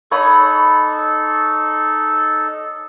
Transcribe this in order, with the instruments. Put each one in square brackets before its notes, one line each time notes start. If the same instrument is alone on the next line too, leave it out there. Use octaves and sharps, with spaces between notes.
[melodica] D#4 A4 [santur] C#5 B5 D#6